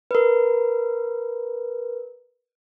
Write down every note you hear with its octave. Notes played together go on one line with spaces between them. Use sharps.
A#4 B4